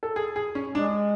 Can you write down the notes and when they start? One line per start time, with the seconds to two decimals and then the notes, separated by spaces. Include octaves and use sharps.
0.03 A4
0.16 G#4
0.36 G#4
0.55 C#4
0.75 G#3 D4